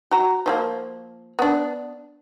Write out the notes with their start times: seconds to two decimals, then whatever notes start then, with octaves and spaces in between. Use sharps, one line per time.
0.11 F#4 A#5
0.46 F3 F#3 A#3
1.39 B3 D4